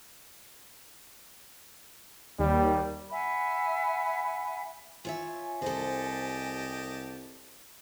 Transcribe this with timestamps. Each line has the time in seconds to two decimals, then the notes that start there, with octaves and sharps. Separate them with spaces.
2.39 D#2 G3
3.11 E5 F#5 G#5 B5
5.05 F4 C#5 E5 G#5
5.62 C2 G4 A4 C5 D#5 A5